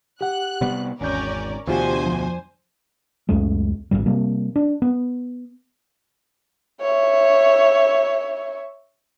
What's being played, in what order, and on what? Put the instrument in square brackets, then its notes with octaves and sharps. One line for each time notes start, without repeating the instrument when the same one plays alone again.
[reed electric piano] G4 F#5 [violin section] F#6
[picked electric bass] C3 G3 B3
[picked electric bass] G#1 [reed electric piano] E2 G6 [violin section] C#4 A#4 D5
[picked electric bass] D2 B2 [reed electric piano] E3 F4 G4 [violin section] D4 C5 G#5
[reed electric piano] F2 F3
[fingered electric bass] C#2 F#2 G#3 A3
G#1 F2 G#2 G3
C3 G3 A#3
D4
B3
[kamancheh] C#5 E5